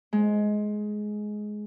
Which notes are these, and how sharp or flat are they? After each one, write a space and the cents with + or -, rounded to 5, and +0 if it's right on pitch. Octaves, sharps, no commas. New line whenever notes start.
G#3 +15